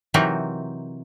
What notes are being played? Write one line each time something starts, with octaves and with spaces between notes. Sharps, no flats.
C3 E3 F#3 C4 D#4 A#4